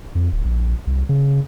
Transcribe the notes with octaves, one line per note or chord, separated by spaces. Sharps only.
F2
D1
A#1
C2
C#3